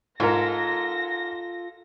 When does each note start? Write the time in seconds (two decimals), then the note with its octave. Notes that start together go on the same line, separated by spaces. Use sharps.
0.20 G#2 F4 A4 A#4 A#6